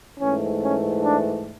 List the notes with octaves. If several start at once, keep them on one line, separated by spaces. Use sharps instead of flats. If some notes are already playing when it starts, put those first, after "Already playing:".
G#2 E3 A3 C#4
C#4
D4